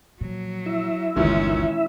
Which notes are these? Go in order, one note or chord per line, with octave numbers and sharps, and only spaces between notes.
A#2 F3 F#3
E4 E5
G1 D2 A#2 D#3 E3 G#3 C#4